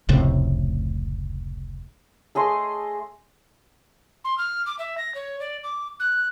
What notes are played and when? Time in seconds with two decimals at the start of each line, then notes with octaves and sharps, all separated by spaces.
0.09 F1 C#2 A2 C3
2.35 A3 G#4 D#5 C6
4.24 C6
4.38 F6
4.66 D6
4.78 E5
4.97 A#6
5.14 C#5
5.40 D5
5.63 D6
6.00 F#6